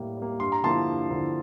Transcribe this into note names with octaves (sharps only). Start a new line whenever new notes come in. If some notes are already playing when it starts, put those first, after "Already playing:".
Already playing: A2 G3 A#3
G3 A#3
G2 C6
A#5
D3 F3 A#3 E4 A5 C6
G2
D3 F3 A#3 E4